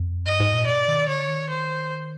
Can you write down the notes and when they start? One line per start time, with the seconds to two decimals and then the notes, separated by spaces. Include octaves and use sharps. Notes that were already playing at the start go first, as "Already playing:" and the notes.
Already playing: F2
0.27 G2 D#5
0.40 G#2
0.54 A#2
0.67 B2 D5
0.88 D#3
1.08 D3 C#5
1.28 D#3
1.50 C5